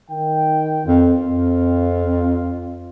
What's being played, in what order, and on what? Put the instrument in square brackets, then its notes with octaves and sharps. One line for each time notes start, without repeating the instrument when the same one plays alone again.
[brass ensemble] D#3 G5
[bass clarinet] F2 [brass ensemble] C4 F4
[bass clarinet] F2